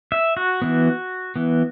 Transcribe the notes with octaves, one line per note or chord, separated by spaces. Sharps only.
E5
F#4
E3 B3
E3 B3